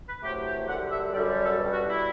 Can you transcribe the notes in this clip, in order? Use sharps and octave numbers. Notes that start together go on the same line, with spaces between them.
B4
E2 C3 F#3 A3 G4
G4
F#2 D3 G3 F#5
E5
F#2 D3 G3 D5
A4
B2 G3
F#4
E4